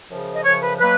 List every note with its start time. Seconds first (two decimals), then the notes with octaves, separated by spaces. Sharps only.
0.09 F#2 C#3 F3
0.34 D#5
0.44 F#2 C#3 F3 C#5
0.61 B4
0.79 B2 F#3 A#3 B4